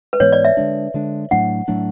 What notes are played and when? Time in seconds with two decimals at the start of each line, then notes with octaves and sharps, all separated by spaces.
0.13 B4
0.20 G#2 E3 G#3 B3 C#5
0.33 D5
0.45 E5
0.57 D3 G#3 D4
0.94 D3 G#3 D4
1.31 A2 F#3 A3 D4 F#5
1.68 A2 F#3 A3 D4